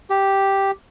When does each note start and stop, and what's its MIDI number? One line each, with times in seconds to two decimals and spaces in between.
0.10 0.71 67